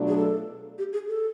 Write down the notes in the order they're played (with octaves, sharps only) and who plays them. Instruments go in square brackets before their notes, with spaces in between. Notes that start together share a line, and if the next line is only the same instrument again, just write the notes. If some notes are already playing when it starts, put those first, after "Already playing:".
Already playing: [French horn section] B2 F#3 A3 D4 F4
[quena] G#4
A4
G4
G#4
A4